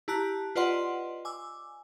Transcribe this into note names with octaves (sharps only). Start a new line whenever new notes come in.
E4 G4 A5 A#5 F#6 B6
F4 B4 D5 D#5 F#5 C6
G#5 D6 E6